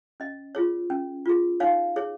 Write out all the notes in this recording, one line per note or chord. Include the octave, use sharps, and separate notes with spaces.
C#4 D#5
F4 G#4 C#5
C#4
F4 G#4
D#4 C#5 F5
G#4 C#5